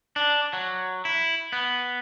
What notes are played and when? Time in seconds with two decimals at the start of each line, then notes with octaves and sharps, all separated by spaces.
0.16 D4
0.53 F#3
1.05 E4
1.53 B3